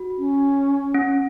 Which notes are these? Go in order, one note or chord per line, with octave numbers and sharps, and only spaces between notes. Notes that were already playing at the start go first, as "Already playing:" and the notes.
Already playing: F#4
C#4
C#4